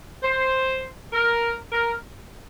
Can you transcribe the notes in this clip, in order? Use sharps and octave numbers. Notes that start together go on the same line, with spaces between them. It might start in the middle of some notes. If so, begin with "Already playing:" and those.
C5
A#4
A#4